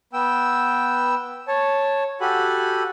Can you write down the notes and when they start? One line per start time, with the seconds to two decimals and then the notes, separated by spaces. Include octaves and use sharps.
0.13 B3 G5 E6
1.48 C#5 A5
2.21 F#4 G4 A4 G#5 B5